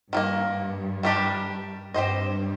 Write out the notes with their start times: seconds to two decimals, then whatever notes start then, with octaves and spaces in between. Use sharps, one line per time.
0.13 G2 D#3 G3 A#3
1.03 D#3 G3 D4 G4
1.94 G2 C4 G4 C5 D#5